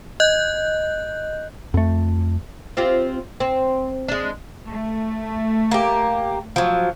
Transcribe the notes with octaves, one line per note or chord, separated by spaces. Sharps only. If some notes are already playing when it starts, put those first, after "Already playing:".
D#5 F#6 G6
F2 A3
C4 F4 G4
C4
G#3 D4
A3
A#3 G4
F3 F#3